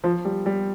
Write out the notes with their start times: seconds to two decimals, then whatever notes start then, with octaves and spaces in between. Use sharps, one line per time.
0.04 F3
0.25 G3
0.46 G3